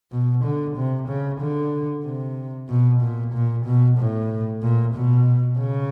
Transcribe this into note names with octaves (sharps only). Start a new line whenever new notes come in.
B2
D3
C3
C#3
D3
C3
B2
A#2
A#2
B2
A2
A#2
B2
C#3